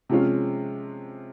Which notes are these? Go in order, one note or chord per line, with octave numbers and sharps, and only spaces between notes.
C3 F3 G#3 C#4 F4